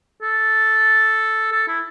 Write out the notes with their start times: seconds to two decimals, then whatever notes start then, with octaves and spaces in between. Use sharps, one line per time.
0.22 A4
1.52 A4
1.67 E4